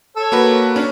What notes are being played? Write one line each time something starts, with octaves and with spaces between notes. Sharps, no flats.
A4 C#5
A#3 F#4 B4
C#4 D4